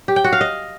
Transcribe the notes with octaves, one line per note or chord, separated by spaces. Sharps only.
G4
G5
F#4
F5
D#5